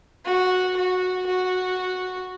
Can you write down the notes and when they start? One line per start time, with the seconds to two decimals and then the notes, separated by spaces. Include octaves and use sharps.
0.25 F#4
0.76 F#4
1.26 F#4